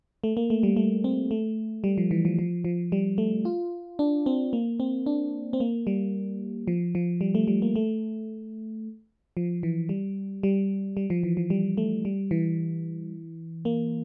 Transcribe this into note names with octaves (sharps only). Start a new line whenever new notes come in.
A3
A#3
A3
G3
A3
C4
A3
G3
F3
E3
F3
F3
F3
G3
A3
F4
D4
C4
A#3
C4
D4
C4
A#3
G3
F3
F3
G3
A3
G3
A#3
A3
F3
E3
G3
G3
G3
F3
E3
F3
G3
A3
G3
E3
A#3